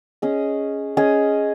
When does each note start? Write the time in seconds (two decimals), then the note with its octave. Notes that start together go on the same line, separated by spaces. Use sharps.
0.22 C#4 G#4 D#5
0.97 C#4 G#4 D#5